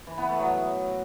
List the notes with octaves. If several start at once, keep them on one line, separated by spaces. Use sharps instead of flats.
E3
B3
A3
F#3